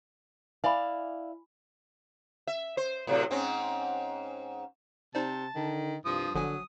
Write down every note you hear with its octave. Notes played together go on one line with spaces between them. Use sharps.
E4 D5 F5 G#5 B5
E5
C5
A2 C3 F#3
G#2 C4 C#4
C3 D#4 C5 D5 A5
D3 D#3
C2 G2 F3 D#6
G1 D3 F3 F#3 G#5 D#6